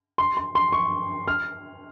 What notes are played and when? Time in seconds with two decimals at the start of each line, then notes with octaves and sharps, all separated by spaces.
0.18 C6
0.37 C6
0.55 C6
0.72 C#6
1.28 F6